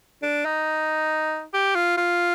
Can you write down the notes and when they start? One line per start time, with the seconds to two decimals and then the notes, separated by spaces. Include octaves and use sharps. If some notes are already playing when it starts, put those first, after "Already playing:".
0.23 D4
0.45 D#4
1.54 G4
1.75 F4
1.97 F4